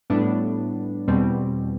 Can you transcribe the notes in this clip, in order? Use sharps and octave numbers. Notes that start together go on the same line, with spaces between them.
A2 G3 B3 D4
E2 B2 G3 C4